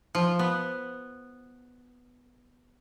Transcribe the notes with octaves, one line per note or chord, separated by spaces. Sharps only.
F3
B3